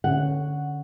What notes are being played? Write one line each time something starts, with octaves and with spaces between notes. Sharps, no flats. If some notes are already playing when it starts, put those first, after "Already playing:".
D3 C#4 F#5